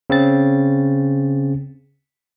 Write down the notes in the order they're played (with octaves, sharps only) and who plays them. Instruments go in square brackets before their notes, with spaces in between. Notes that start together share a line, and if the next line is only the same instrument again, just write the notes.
[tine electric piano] C#3 C4 A6